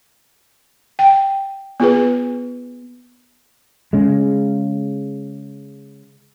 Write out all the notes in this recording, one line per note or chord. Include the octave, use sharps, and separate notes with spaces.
G5
B3 F4 G#4 B4
C#3 G#3